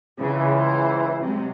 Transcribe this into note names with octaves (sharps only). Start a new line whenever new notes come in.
C#2 C#3 E3
C5
C3 F#3 G#3